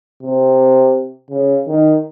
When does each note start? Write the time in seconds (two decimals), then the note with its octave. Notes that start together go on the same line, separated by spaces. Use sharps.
0.23 C3
1.31 C#3
1.67 D#3